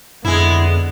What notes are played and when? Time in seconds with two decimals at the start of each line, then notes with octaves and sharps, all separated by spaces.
0.25 F2 D3 G#3 B3 E4